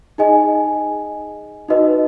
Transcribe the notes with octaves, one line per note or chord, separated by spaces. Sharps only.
D#4 G#4 D#5 G#5
D#4 F#4 B4 D#5